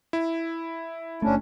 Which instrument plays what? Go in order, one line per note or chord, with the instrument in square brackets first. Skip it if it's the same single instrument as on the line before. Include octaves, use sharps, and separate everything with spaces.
[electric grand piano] E4
[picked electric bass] F#1 A3 [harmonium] C#4 D4